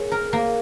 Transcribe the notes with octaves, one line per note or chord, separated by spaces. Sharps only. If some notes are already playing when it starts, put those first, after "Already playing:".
Already playing: A#3 G#4 C#5
A#4
A#3